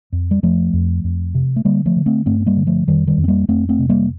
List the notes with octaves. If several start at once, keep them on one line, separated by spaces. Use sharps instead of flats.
F2
G3
F2 F3 A3
F2
F2
C3
A3
D3 G3 A#3
F3 A3
D3
A3 C4
G2 A3 C4
C4
G3 A#3
D3
F3 A3
F2 D#3 G3
D#3 G3
F2
C4
G3 A#3
F2 A3 C4
A3 C4
C3
G3 A#3